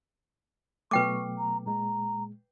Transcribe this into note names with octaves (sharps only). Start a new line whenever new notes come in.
B2 F#3 A3 B4 G5 C#6 D6
A#5
A#2 G#3 A#5